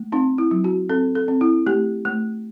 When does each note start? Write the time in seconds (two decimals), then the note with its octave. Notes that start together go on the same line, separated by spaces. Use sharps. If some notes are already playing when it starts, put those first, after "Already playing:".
Already playing: A3
0.12 C4 D#4
0.38 E4
0.51 F#3
0.64 F#4
0.89 C4 A4
1.15 A4
1.28 C4
1.41 E4
1.66 A3 G4
2.05 A3